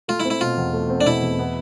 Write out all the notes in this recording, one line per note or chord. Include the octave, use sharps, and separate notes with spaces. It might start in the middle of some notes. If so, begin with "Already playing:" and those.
A3 F4
E4
C4
E4
B2 F4
E2
A3
C4
D4
B2 E4
E2
B3